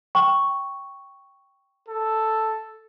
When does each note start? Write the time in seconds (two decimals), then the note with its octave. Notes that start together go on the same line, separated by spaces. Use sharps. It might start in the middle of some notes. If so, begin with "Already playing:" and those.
0.15 G5 C#6
1.88 A4